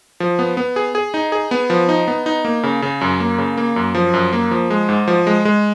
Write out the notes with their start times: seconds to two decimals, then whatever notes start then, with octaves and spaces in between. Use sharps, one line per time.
0.20 F3
0.39 B3
0.57 B3
0.76 G#4
0.95 G#4
1.14 D#4
1.32 G#4
1.51 B3
1.70 F3
1.89 D#4
2.07 B3
2.26 D#4
2.45 A#3
2.63 C#3
2.82 C#3
3.01 F#2
3.20 A#3
3.38 C#3
3.58 A#3
3.76 F#2
3.95 F3
4.14 F#2
4.33 A#3
4.51 F3
4.70 G#3
4.89 G#2
5.08 F3
5.27 G#3
5.45 G#3